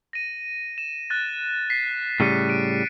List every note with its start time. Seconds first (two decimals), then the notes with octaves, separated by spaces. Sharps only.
0.13 A#6 D#7
0.78 E7
1.10 F#6 A6
1.70 B6 C7
2.20 A2 C#3 G3 C7 C#7 D#7
2.49 D7 D#7